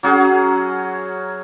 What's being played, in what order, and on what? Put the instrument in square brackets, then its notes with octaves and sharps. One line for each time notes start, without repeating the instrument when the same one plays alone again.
[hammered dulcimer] F#3 C#4 F#4 G#4